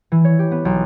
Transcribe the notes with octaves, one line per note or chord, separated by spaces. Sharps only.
E3
C#5
G4
B3
B1